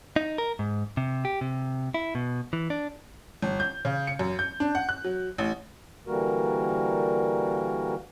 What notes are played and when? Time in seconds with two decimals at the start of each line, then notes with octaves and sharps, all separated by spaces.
0.16 D#4
0.38 A#4
0.59 G#2
0.97 C3
1.25 G4
1.41 C3
1.94 E4
2.15 B2
2.53 E3
2.70 D4
3.42 G1
3.60 G6
3.85 C#3
4.07 C#7
4.19 F#2
4.39 G6
4.60 D4
4.75 F#5
4.89 F#6
5.04 F#3
5.38 A1
6.07 D3 E3 G3 A#3 F#4 A#4